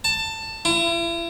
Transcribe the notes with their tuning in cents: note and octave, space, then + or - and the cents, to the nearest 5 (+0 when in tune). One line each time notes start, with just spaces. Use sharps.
A5 +15
E4 +40